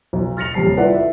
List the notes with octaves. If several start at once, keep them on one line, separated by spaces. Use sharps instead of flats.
B1
F6 A6 A#6 C#7 F7
D#1 C3 G3 A5 C7
E4 F4 A4 B4 D5 F#5
E5